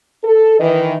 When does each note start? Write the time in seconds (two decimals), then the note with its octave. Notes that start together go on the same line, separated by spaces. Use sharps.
0.24 A4
0.60 D#3 E3 D#5